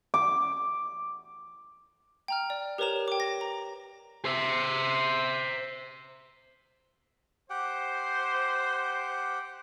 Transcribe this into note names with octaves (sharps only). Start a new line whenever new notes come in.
D6
G5 A#5 F6
D5
G4 A#4 B4 C#5 A#5 E7
G5 D6
A#6
A#5
C5 E5
G4 C5 F#5 G5